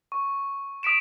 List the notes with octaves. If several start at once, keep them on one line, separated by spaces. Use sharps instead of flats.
C#6
D#6 B6 D7 E7